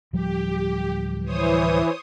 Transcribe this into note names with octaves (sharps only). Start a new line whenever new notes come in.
D1 F3 G3 G4
E3 C5 C#5 D#6